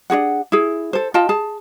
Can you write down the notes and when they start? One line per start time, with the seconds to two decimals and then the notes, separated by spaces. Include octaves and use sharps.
0.10 D4 F#4 G#4 F#5
0.52 E4 G#4
0.93 A4 C5
1.14 F4 D#5 G5 A5
1.29 G#4 A5